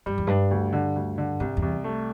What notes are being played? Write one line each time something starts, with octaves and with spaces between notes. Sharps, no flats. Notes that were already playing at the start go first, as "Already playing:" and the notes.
G2 G3
E2
G2 D4
D2
D3
D2
D3
C2 G2
E2
C2
A3